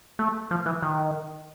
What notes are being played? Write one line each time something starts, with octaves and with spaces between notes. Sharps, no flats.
A3
F3
E3
D#3